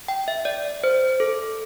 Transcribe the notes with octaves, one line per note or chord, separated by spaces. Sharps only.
G5
E5
D5
C5
A4